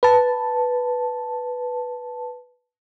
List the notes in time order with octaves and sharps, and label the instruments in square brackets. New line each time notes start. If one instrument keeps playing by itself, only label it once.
[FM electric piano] B4 A5